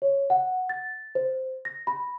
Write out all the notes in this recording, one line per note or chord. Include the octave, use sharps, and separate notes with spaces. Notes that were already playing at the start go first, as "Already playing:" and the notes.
C#5
F#5
A6
C5
A#6
B5